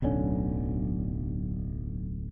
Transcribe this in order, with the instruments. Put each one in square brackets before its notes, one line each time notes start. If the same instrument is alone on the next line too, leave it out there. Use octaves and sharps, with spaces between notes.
[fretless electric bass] D1 B1 D3 C#4